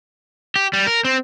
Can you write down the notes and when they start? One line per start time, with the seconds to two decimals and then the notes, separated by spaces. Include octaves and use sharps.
0.56 G4
0.73 G3
0.87 A#4
1.05 C4